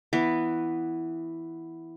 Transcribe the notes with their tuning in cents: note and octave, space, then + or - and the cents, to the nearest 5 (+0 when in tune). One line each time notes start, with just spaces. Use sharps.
E3 +0 B3 +0